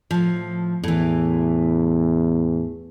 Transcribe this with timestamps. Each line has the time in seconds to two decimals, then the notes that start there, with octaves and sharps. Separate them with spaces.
0.11 A2 F3
0.84 E2 A2 E3